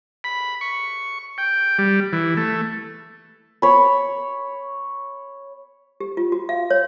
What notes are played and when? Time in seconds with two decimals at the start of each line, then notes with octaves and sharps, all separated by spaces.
0.24 B5
0.61 C#6
1.38 G5
1.78 G3
2.13 E3
2.37 A3
3.62 C#5 B5
6.01 G4
6.17 F4
6.32 F#4
6.49 F5
6.70 C#5